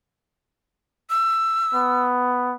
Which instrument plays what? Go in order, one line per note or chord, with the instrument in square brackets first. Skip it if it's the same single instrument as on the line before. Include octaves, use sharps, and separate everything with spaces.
[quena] E6
[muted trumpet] B3